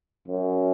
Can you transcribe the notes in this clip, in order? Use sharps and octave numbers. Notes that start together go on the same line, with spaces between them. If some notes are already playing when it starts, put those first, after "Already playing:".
F#2